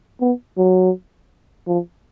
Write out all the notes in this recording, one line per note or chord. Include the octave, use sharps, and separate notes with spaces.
B3
F#3
F3